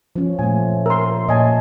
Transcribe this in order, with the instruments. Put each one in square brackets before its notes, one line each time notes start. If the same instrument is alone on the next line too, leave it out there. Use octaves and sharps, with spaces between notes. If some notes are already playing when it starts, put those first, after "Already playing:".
[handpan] F3 C#4
[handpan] A#2 A3 [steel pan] G#5
[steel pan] A#4 C6
[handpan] A#2 C#5 [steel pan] D#5 G#5 A5